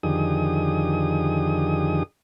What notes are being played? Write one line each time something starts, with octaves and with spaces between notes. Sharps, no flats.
F2 D3 D#3 G4 G#4 D#6